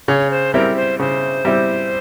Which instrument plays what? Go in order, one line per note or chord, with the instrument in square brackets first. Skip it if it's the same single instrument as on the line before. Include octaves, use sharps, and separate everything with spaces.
[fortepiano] C#3 [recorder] C#5
[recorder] C5
[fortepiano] G3 C4 E4 [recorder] A#4
[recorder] C5
[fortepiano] C#3 [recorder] C5
[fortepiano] G3 C4 E4